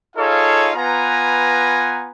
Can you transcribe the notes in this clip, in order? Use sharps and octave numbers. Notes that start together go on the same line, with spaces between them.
D#4 F4 G#4 A4 C#5 F5
B3 F4 B4 G#5 A#5